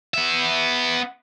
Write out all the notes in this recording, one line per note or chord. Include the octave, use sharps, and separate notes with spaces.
B3 E5